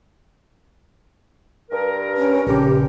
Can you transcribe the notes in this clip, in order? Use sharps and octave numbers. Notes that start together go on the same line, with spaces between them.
G2 A#4
C#4
A#1 C#3 G4